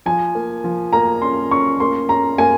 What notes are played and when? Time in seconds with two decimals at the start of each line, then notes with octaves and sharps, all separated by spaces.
0.06 F3 G#5
0.35 A#3
0.64 F3
0.93 A#3 A#5
1.22 C#4 C6
1.51 C#4 C#6
1.80 A#3 C6
2.09 C#4 A#5
2.38 A#3 G#5